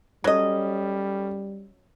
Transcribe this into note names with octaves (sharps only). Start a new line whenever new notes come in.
F#3 G3 C#4 A4 D#5